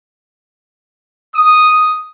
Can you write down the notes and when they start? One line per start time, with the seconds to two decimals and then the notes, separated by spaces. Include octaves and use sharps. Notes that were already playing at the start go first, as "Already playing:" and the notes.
1.36 D#6